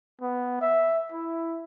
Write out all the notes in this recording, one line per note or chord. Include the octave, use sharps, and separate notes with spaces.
B3
E5
E4